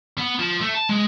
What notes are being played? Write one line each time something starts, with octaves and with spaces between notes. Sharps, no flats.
B3
F3
A3
A5
G#3